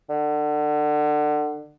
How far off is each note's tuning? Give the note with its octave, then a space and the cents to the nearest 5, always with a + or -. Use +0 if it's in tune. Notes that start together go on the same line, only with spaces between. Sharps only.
D3 +30